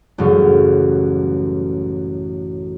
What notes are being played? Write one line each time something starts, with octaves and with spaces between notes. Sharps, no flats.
A1 F#2 C#3 F#3 G3